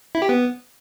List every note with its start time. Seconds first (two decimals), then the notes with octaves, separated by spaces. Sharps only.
0.15 E4
0.22 G4
0.29 B3